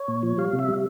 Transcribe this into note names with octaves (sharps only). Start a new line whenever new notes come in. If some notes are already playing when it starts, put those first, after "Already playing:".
Already playing: C#5
A#2
F3
G3 F5
C3
E5
G3